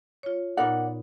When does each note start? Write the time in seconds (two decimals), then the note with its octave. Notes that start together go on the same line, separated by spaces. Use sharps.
0.23 F4 C#5
0.57 A#2 B3 D#4 A#4 D5 F#5